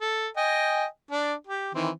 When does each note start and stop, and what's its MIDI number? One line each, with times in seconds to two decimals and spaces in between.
0.01 0.28 69
0.37 0.85 75
0.37 0.85 79
0.37 0.85 80
1.11 1.34 62
1.11 1.34 74
1.47 1.74 67
1.75 1.90 51
1.75 1.90 52
1.75 1.90 60